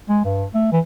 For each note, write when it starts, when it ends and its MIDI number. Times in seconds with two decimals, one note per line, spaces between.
0.09 0.21 56
0.25 0.45 43
0.55 0.70 57
0.72 0.80 52